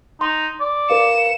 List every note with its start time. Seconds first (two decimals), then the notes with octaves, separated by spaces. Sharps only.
0.21 D#4 C6
0.60 D5
0.90 A#4 B4 F5 C#7 E7